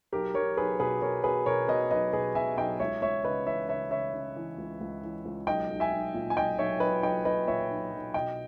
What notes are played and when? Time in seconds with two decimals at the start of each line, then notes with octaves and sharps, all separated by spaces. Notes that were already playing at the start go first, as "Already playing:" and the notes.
0.12 B1 G4 A#4
0.34 B1 A#4 C#5
0.57 B1 G#4 B4
0.79 B2 G#4 B4
1.02 B2 A#4 C#5
1.24 B2 G#4 B4
1.46 B2 A#4 C#5
1.68 B2 B4 D#5
1.91 B1 B4 D#5
2.13 B2 G#4 B4
2.35 B2 E5 G#5
2.57 B1 D#5 G5
2.80 C#2 C#5 E5
3.02 C#2 C#5 E5
3.24 C#3 B4 D#5
3.46 E3 C#5 E5
3.69 C#3 C#5 E5
3.91 C#3 C#5 E5
4.14 C#3
4.36 E3
4.58 C#2
4.81 C#2
5.03 E3
5.25 C#2
5.47 B1 D#5 G5
5.69 B1
5.80 E5 G#5
5.92 B1
6.14 A#2
6.30 G#5
6.36 B1 D#5 G5
6.58 B1 C#5 E5
6.80 B1 B4 D#5
7.03 B1 D#5 G5
7.25 B1 B4 D#5
7.47 A#2 C#5 E5
7.70 B1
7.92 B1
8.14 B2 D#5 G5